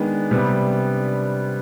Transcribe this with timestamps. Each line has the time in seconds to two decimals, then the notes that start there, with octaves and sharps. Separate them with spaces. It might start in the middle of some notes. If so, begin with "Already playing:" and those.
Already playing: D#3 G#3 B3 D4
0.31 C3 G3 B3